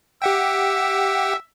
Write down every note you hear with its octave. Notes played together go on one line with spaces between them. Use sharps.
G4 E5 F#5 G5